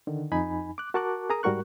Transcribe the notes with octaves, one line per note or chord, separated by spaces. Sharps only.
D3 D#3
F2 D#4 G#5 B5
D6 F#6
F#4 A#4 A5 C#6 D6 F#6
G#4 A#4 A#5 D#6
G#2 G3 F#4 A#4 C#6 F#6